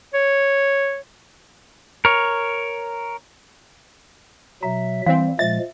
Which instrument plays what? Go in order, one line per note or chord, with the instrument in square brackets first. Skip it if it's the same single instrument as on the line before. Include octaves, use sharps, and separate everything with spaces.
[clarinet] C#5
[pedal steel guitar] A#4 C#5
[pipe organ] B2 F#3 E5 [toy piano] A#5
[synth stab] E3 C4 [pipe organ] G3 [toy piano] F5
[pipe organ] A#2 F3 G#3 [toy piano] E5 [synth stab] A6